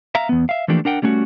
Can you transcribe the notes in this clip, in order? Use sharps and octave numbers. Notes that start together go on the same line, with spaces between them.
E5 F5 A#5
E2 B3
E5 F5
E3 F3 A3 A#3 D4 G4
D4 A#4 F#5 G5
G3 A3 C#4 D4 F#4